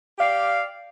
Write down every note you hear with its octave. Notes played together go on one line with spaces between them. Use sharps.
G4 D5 F5